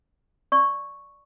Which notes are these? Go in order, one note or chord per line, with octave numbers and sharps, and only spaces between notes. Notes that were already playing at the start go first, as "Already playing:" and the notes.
D5 C#6